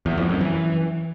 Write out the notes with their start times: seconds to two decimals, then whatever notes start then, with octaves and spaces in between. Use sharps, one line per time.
0.06 E2
0.17 F2
0.29 F#2
0.41 E3